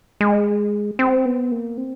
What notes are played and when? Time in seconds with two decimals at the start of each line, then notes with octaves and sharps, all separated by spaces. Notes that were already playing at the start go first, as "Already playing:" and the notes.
0.21 G#3
0.99 C4
1.25 B3
1.52 A#3
1.78 C4